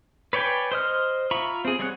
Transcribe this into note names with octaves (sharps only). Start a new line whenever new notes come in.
B4 C#5 D5 G5 G#5
C5 D#5 F6
F4 E5 A#5 B5 C#6
C4 G#4
G3 G#3 G#4 C#5 F#5